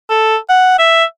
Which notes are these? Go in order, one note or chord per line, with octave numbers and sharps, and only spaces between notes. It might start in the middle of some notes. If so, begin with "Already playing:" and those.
A4
F#5
E5